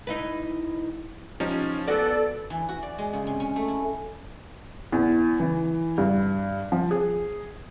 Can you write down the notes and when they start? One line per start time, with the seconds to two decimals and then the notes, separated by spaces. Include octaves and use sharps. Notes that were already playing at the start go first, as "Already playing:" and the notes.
0.07 D#4 E4 B4
1.40 F3 C#4 D#4 G4
1.88 B3 F#4 A4 D5
2.50 E3
2.69 F#4
2.83 D5
2.98 G#3
3.13 C#3
3.27 C3
3.40 C#4
3.56 A3
3.68 E4
4.92 E2
5.40 E3
5.98 G2
6.72 F3
6.91 G#4